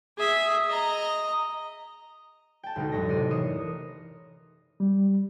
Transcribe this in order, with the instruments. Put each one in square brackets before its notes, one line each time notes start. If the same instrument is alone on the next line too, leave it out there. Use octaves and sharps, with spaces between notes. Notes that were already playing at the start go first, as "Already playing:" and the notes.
[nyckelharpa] G#4 E5
D#5 A#5
[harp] G5 A5
D2 B2 G#3 D#4
A1 F#2 C#5 A#6
C3 D5 D#7
E3 A#4 D#6 C7 C#7 E7
[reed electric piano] G3